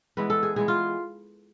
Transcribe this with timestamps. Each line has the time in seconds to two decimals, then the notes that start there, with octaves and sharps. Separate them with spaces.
0.17 E3 G#3 B3 B4
0.30 A4
0.43 G#4
0.56 E3 G#3 B3 G#4
0.68 F4